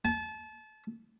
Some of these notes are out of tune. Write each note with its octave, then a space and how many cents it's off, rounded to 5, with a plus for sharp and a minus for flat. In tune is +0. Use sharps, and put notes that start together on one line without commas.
A5 -30